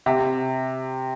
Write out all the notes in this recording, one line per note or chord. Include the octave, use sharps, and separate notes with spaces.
C3